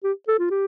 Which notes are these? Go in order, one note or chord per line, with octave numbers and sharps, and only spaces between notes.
G4
A4
F4
G4